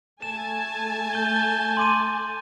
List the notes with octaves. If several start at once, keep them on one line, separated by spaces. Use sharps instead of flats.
A3 G#5 A5 E7
G6 G7
C6 D6 D#7